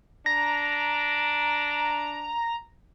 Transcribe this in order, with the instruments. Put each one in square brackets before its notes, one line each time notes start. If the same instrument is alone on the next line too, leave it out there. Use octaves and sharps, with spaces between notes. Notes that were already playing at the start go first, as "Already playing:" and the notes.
[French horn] D4 [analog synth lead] A#5 [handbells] A#6